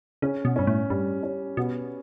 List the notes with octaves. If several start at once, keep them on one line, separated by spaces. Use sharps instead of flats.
C#3 C#4
B2
G2 C#4
A2
G2 G3
C#4
B2 B4